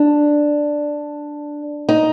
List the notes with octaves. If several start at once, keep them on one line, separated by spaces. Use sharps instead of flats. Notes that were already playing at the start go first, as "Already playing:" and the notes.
Already playing: D4
D#4